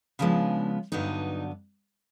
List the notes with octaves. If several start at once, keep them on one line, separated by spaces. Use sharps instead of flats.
C#3 F3 G#3 B3 D4
G2 D3 F#3 B3 D4 D#4